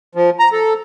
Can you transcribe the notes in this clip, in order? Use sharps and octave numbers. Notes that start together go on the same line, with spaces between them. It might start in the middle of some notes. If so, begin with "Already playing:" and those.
F3
A#5
A4